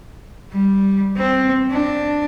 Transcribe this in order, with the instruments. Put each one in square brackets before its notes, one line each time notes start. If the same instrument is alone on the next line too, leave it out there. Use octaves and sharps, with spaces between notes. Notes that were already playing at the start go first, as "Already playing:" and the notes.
[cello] G3
C4
D4